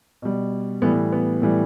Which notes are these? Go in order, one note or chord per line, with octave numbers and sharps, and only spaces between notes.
B2 G3
A2 E3 G3 B3
B3
A2 E3 G3